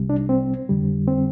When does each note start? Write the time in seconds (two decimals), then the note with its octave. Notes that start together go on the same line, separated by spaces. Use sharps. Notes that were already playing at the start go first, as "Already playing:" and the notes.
Already playing: C2 C3 G3
0.10 D4
0.29 C4
0.69 F2 D3 G3
1.08 C4